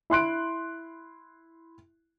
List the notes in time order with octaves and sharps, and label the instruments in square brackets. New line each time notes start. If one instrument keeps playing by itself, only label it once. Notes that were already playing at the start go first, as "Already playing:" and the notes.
[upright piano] E4 C6 F#6 D7